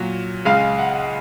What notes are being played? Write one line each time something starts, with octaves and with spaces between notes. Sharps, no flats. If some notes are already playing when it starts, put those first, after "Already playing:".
Already playing: A#2 F#3
C#2 C#3 G#3 F5
F#5